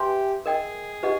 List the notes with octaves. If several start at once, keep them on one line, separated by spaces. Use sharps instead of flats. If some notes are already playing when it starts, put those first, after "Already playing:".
Already playing: G4 B4 E5 G#5 C6
G#4 A#4 D#5 G5
G4 B4 D#5 F#5